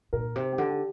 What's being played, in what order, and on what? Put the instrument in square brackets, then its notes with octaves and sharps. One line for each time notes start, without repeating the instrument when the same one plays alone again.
[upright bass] A#2 [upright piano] A#4
[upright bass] C3 [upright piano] G4
[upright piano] G4
[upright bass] D3
[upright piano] G4